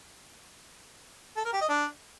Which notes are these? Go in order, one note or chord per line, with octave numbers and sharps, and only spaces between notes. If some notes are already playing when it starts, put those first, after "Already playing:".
A4
A#4
G4
D#5
D4